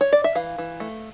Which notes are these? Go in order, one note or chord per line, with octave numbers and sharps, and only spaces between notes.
C#5
D5
E5
E3 F5
E3
A3